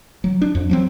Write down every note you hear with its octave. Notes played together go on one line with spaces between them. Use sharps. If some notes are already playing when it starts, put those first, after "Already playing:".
F#3
D4
F2
F3 F#3 C4